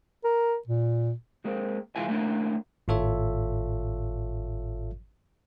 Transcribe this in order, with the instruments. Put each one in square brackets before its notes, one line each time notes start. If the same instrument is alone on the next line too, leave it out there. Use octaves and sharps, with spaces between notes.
[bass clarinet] A#4
A#2
[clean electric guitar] G#3 A#3 C4
C2 E3 G#3 E4 F4 G#5
A3 A#3 C#4 D4 E4
[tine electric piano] G#1 A2 F4 A4 C#5 E5